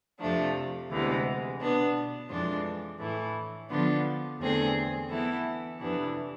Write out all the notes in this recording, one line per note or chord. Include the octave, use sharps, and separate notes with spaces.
F2 C3 F3 A3 D4
D2 C3 E3 G#3 B3
B2 B3 D4
F2 E3 G#3 D4 F4
A2 E3 A3 E4
D3 F3 B3 D4 F4
E2 D3 A3 C4 G#4
E3 B3 E4 A4
F2 C3 E3 B3 D4